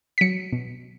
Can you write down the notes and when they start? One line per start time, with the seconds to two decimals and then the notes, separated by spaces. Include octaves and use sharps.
0.18 B6
0.21 F#3 C#7
0.52 B2